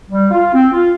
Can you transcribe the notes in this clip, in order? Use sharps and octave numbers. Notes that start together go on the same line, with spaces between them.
G3
F4
C4
F4